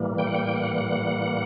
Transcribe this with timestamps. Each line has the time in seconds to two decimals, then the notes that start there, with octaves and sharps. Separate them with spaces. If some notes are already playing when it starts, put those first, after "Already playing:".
Already playing: A2 E3 G3 A#3
0.18 G5
0.27 F#5
0.35 G5
0.55 F#5